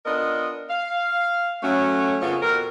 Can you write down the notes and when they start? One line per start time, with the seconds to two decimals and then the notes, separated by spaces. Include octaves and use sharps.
0.05 B3 D4 F4 A#4 D#5
0.70 F5
1.63 F#3 A3 C#4
2.21 F2 C#3 A#3 B3 F4 C#5
2.42 F2 B2 G4 A#4